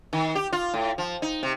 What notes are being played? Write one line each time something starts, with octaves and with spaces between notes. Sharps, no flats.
D#3
G4
F4
A2
F3
D#4
C3